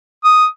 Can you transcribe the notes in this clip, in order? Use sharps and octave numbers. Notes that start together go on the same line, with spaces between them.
D#6